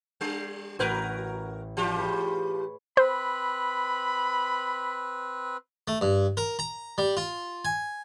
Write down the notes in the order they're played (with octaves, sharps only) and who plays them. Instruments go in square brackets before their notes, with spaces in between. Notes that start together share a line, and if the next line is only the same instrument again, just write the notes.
[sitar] G3 D4
[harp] A1 G6 G#6 [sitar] F#4 A#4 B4
[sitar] E3 F4 G4
[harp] G#4 B4 C#5
[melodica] C4 B4 [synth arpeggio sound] C5 [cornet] B5
[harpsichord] A3
G2
A#4
A#5
G3
F4
G#5